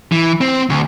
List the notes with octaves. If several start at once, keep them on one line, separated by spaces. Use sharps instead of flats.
E3
C4
D2